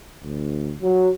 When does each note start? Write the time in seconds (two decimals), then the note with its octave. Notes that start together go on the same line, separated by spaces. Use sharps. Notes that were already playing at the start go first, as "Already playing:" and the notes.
0.23 D2
0.82 F#3